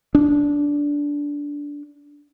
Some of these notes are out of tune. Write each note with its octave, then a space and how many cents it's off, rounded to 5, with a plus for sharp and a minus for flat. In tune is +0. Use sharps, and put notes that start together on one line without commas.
D4 -15